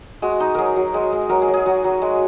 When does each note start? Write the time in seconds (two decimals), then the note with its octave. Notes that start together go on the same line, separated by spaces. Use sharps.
0.22 G#3 F#4
0.40 D#4
0.55 F#3 G#4 A#4
0.76 F#3
0.94 G#3
1.12 G#3
1.29 F#3 A#4
1.42 G#4
1.48 F#3
1.54 G#4
1.66 F#3 F#4
1.84 F#3
2.02 G#3